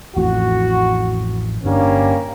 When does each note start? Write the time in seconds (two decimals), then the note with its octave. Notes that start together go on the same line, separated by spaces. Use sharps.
0.17 A1 F2 A2 F#4
1.64 G1 G3 A#3 C#4 D4